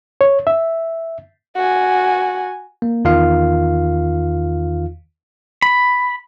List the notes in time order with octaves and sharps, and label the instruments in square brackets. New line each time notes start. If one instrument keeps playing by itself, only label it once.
[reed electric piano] C#5
E5
[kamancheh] F#4 G#5
[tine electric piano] A#3
E2 D#3 F4 F5
[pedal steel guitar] B5